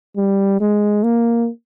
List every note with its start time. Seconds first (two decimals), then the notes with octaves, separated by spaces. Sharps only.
0.17 G3
0.60 G#3
1.03 A#3